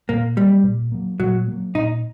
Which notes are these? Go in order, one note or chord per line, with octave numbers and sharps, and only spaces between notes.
A#2 A#3
F#3 G3 A#3
A#2
F#3 A#3
A#2 F#3
F#3 A#3
A#2 D#4